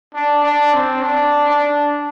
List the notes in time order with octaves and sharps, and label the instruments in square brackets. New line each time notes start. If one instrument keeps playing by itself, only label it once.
[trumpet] D4
D4
C4
D4
D4